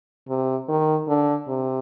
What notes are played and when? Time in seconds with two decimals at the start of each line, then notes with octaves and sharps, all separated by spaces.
0.29 C3
0.69 D#3
1.08 D3
1.48 C3